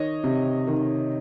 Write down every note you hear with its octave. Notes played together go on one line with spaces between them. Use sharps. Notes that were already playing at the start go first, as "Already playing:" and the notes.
Already playing: D#3 C#5 D#5
C3
D#3